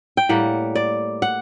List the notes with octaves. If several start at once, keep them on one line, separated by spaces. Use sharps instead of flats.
G5
A2 G3 A#3 F#5
D5
F#5